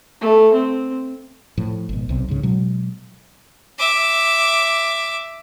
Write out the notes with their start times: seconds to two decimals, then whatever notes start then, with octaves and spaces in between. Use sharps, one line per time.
0.21 A3
0.53 C4
1.58 A2 F3
1.89 G#1 B2
2.09 B1 C3
2.28 C#2 G#2 C#3
2.43 B2 F#3 G#3
3.79 E5 D6